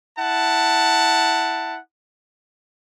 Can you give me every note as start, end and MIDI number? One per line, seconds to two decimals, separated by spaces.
0.18 1.77 64
0.18 1.77 78
0.18 1.77 81